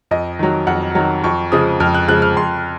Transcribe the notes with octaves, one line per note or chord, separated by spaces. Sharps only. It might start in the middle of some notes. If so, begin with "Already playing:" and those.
F2 D#5
D#3 F#3
F2 F#5
D#3 F#3
F2 C#6
C#3 F3 G#3 D#6
F2 F6
F#6
C#3 F3 G#3 F#6
F6
F2 C6